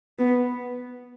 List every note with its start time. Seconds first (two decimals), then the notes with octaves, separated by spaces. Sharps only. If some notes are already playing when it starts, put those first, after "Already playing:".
0.19 B3